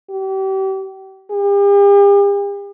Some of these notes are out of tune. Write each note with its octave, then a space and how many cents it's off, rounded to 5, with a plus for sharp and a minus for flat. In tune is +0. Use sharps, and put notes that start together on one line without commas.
G4 -35
G4 +45